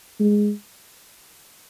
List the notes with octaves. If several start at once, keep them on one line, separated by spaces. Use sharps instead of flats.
G#3